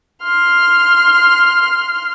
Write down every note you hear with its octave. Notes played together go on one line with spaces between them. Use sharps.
C6 F6